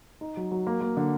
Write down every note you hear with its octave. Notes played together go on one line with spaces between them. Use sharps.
D#4
F#3
F#3
A#3
A#3
D3